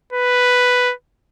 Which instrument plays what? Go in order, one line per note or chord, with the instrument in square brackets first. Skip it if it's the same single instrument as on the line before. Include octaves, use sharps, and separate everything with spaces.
[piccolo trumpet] B4